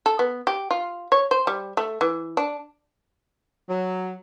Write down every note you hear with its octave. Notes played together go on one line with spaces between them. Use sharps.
A4
B3
G4
F4
C#5
C5
G3
A3
E3
D4
F#3